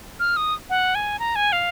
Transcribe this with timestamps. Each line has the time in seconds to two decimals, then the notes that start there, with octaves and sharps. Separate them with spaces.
0.20 F6
0.37 D#6
0.70 F#5
0.95 G#5
1.19 A#5
1.36 G#5
1.52 F5